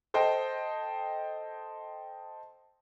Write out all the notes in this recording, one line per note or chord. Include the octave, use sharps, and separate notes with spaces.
A4 C5 D#5 G5